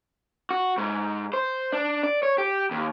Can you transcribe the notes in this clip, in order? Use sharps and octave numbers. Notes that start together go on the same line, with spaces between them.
F#4
G#2
C5
D4
D5
C#5
G4
D#2